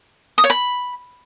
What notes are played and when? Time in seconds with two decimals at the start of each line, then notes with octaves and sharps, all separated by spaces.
0.38 D#6
0.44 C#5
0.50 B5